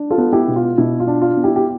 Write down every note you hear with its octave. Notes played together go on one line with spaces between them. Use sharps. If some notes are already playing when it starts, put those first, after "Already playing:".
Already playing: D4
F4 A4
B3
E4 G4
B2
F4
B2 E4
F4
D4
F4
B3
E4 G4
G4